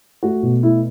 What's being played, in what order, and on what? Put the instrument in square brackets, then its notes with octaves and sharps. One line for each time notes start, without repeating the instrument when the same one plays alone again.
[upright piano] A3 F#4
B2
A3 E4